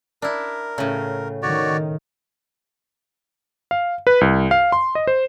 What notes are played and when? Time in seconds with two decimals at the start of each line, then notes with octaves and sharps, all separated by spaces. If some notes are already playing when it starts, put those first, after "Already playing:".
0.22 D4 E4 A#4
0.78 A2 C#3
1.42 D#3 F#4 C#5 D5
3.71 F5
4.07 B4
4.21 C2
4.51 F5
4.72 C6
4.95 D#5
5.07 C5